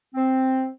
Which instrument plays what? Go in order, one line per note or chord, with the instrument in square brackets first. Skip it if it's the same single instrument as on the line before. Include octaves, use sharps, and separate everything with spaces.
[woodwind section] C4